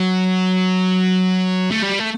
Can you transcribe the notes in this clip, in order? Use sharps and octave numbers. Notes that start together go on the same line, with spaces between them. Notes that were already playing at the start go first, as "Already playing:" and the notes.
Already playing: F#3
A3
G3
A3